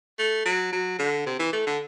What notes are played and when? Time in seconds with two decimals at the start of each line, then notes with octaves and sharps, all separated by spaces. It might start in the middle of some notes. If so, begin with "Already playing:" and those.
0.19 A3
0.46 F#3
0.73 F#3
0.99 D3
1.26 C3
1.39 E3
1.53 A3
1.67 D3